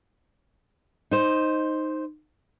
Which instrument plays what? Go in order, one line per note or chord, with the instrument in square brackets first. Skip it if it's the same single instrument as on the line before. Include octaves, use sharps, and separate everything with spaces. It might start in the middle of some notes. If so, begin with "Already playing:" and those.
[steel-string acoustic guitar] D#4 C5